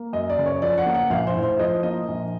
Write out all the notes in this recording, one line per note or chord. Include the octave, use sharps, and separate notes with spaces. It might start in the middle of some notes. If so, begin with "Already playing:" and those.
Already playing: A#3
F#2 D#5
D5
C#3
C#5
F3 D5
F#5
A#3
F#5
A#1 F5
C5
A2
C5
F3 D#5
A#3 D#5
A#1